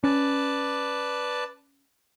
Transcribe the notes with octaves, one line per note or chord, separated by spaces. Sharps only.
C#4 B4 D5 A5